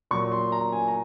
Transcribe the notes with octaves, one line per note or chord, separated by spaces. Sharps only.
A#2 F#3 C#6
C6
A#5
G#5
A#5